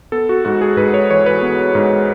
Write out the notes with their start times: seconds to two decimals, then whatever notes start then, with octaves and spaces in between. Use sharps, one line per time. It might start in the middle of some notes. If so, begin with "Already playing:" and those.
0.12 B3 A4
0.29 F#4
0.45 G#2 F#4
0.61 G#4
0.77 G#2 B4
0.94 C#5
1.10 E3 C#5
1.26 B4
1.42 B3
1.75 G#2